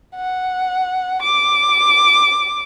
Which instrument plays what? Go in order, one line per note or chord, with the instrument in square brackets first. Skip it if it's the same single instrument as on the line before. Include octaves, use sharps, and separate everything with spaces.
[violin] F#5
D6